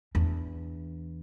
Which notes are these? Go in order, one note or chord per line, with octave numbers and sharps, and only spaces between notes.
E2 D4